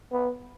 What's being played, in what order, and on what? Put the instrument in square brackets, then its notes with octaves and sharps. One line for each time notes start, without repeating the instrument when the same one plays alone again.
[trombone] B3